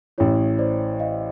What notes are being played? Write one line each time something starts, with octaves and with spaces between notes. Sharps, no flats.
A1 A2 E3 C#5
C5 D5
D#5 F5